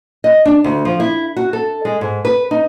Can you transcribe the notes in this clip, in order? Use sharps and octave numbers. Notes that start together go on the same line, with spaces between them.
D#5
D4
D2
F3
E4
F#4
A4
G#3
G#2
B4
D#4